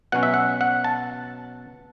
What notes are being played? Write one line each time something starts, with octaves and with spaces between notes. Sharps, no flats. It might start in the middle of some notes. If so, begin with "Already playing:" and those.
B2 F#3 C#4 F#5
E5
F#5
F#5
A5